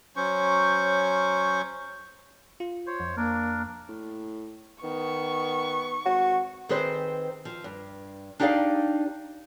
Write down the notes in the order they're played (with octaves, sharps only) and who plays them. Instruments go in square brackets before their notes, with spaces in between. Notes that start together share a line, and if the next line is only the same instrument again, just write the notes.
[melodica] F#3 C#4 C5 C#6
[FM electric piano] F4
[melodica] C5 C#5
[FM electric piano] F2
[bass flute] A#3 [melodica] D4 A#4
[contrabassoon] A2
[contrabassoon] D#3 [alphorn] B3 [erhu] C#6
[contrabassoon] G#1 [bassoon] F#4
[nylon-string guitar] D#3 C4 G#4 B4 C5
F3
G2
D4 D#4 G4 G#4 D5 F5